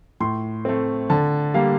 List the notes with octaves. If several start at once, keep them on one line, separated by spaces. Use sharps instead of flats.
A2 C6
A3 C4
D3 A5
G3 A#3 F5